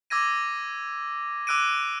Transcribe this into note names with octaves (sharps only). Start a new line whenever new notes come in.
D6 E6 G#6 A#6 D#7
D6 E6 F#6 D7 D#7